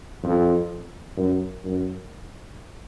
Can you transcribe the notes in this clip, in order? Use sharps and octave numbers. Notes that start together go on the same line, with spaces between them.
F2
F#2
F#2